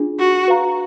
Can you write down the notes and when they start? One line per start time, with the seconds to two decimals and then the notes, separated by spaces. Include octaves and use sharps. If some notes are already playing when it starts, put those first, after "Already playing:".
Already playing: D4 F4 G#4
0.19 F#4
0.48 B4 F5 A#5